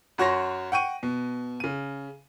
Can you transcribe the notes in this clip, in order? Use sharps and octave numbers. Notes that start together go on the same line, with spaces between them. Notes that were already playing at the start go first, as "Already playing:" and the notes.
F#2 F#4 C#5 C6 A#6
F#5 G5 C#6 D#7
B2
C#3 D#7